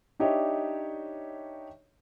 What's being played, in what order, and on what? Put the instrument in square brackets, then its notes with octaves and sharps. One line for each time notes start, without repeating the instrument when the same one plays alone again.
[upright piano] D4 D#4 G4 C#5 D#5 E5